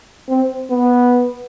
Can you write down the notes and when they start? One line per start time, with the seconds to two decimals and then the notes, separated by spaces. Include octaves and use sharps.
0.29 C4
0.70 B3